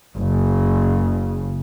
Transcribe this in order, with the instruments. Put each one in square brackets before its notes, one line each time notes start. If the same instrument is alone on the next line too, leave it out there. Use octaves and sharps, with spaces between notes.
[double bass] F#1 C#3